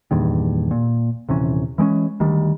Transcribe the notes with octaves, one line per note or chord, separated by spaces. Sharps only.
E2 G2 A#2 D#3
A#2
D#1 C3 E3 C#4
E3 G#3 A#3 C#4
D2 D#3 G3